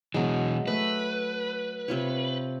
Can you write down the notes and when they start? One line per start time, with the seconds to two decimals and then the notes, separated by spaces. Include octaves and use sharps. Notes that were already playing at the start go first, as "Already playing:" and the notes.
0.14 B2 E3 F#3 G#3
0.67 A3 B4
1.88 C3 F4 C#5